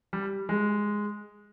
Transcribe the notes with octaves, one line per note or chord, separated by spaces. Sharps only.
G3
G#3